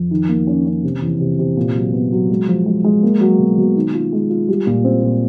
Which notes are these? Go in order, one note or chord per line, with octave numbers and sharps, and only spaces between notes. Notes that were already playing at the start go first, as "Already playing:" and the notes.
Already playing: F2
D#3
A#3
C#4
C#4
C3
E2
C3
C3
A#2
F#3
B3
F#3
G#3
F3
G#3
G#3
A#3
F#3
B2
B2
D#3
F4
G#3
F4
G3
A#2
C4
A#2